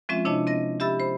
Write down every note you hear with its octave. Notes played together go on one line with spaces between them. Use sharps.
F3 G#3 C4 C#4 F4 E5
C3 D4 E4 C#5 D#5 A5
C4 D#5 A#6
G4 E5 B5 E6 A6
C5 B5